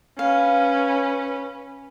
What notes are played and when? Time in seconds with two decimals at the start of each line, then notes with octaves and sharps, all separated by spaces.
0.19 C#4 B4 F5